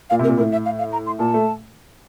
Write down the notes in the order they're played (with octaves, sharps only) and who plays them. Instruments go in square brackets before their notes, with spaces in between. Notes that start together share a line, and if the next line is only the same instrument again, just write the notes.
[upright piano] A#2 [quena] F5
[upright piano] C3
[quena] A#4
[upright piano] A#2
[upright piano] A2 [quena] A#4
[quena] E5
F5
F5
A#5
C6
[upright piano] A#2 [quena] A5
[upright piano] A3